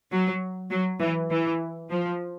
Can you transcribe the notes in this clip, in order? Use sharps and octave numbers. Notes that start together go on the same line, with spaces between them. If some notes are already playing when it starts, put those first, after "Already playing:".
F#3
F#3
E3
E3
F3